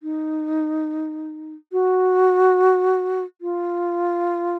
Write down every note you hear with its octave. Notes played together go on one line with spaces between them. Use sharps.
D#4
F#4
F4